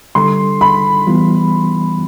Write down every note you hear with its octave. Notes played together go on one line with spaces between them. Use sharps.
D3 G3 D4 A4 C6
B5
E3 G3 B3 F4